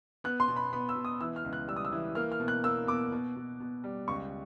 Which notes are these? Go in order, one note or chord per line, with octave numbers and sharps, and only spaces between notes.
B3 F#6
C6
B2
B5
B3 B5
E6
B2
D#6
E3 E6
F6
C#2
F#6
G3 E6
D#6
E6
E3
A#3 F6
F6
B2
F#6
A#3 E6
B2 D6
B2
B2
B2
G3
C#2 C#6